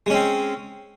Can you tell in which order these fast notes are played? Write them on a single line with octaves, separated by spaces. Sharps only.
G#3 C#4 C4